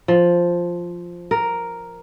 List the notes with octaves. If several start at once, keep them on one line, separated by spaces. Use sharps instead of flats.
F3
A#4